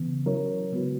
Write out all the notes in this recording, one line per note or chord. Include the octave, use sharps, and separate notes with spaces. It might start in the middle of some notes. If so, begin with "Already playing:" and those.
Already playing: C#3 E3 B3
F#3 C#4 E4 A#4 C#5
C#3 G#3 B3 F#4 B4